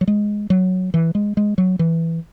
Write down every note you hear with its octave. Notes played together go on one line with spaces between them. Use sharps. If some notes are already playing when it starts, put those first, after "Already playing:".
F#3
G#3
F#3
E3
G#3
G#3
F#3
E3